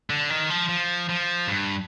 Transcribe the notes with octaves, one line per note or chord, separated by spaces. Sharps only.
D3
D#3
F3
F3
F3
G2